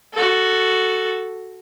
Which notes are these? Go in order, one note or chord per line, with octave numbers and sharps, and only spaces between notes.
F#4 A4